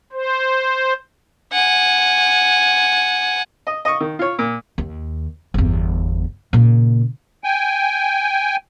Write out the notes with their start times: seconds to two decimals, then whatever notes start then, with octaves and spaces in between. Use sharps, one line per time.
0.13 C5
1.52 F#5 G#5
3.67 D#5
3.85 D#5 C#6
4.00 D#3
4.19 F4 C#5
4.39 A#2
4.78 D#2
5.54 G1 E2
6.53 A#2 C#3
7.44 G5 G#5